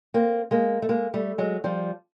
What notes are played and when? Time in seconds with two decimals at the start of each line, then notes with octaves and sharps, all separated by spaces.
0.14 A#3 C4
0.51 G#3 A#3
0.82 A3
0.89 G#3 A#3
1.14 G3 A3
1.38 F#3 G#3
1.64 F3 G3